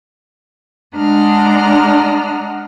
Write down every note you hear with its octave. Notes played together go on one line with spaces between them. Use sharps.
G#3 D4 D#5 F#5 A#5 F6